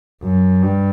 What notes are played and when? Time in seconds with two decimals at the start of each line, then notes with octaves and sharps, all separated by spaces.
0.23 F#2
0.62 G2